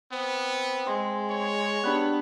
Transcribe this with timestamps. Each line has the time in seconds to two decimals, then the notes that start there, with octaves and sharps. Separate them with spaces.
0.12 B3 C4
0.87 G#3 C6
1.29 C#5
1.84 G3 B3 D4 B5 F#6